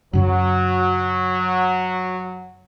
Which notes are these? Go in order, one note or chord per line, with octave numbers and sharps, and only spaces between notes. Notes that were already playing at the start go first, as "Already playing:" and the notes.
F#2 C#3 F#3